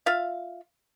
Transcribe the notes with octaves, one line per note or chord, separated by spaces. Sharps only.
F4 E5 F5